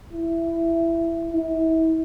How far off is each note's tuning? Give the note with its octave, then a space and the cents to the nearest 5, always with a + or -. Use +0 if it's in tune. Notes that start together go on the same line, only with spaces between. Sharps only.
E4 +15
E4 -35